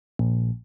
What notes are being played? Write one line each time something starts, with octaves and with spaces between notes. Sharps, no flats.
A#1